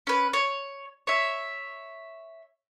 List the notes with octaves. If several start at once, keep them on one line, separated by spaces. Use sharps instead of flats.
C#4 B4
C#5
C#5 E5